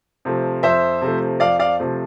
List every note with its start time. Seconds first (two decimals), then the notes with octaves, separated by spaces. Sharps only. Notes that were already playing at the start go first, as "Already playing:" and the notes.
0.25 C3 F3 A3
0.63 F2 C5 E5
1.01 C3 F3 A3
1.40 F2 D5 F5
1.59 D5 F5
1.79 C3 F3 A3